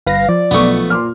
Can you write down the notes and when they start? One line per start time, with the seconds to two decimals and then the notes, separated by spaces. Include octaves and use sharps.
0.06 G1 B4 F5 A#6
0.29 F3 D5
0.51 B1 A3 B3 C#6
0.90 A#2 C6 D6 F6